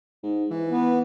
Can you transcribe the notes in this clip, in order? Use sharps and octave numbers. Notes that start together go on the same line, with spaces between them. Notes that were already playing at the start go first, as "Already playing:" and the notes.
G#2
E3
B3